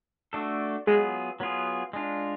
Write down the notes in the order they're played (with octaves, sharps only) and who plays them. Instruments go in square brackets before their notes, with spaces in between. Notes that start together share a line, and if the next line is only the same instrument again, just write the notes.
[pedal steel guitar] A3 D4 F#4 A4
[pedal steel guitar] F#3 B3 F4 G#4 [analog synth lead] G#3
[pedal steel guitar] F#3 B3 F4 G#4
G#3 D4 F4